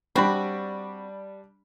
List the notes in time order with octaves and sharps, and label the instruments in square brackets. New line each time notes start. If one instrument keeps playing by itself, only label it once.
[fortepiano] G3 D4 B5 [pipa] C4 F#4